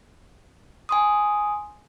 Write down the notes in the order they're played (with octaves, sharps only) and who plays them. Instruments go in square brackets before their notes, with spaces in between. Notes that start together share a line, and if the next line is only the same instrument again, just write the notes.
[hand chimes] G#5 C6 D#6